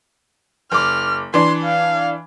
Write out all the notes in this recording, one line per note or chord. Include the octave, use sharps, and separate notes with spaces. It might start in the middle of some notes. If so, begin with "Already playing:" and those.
F#1 D6 F6
E3 D4 C6
F5